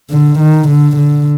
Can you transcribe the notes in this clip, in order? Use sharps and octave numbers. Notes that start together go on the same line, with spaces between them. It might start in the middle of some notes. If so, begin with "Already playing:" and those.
D3
D#3
D3
D3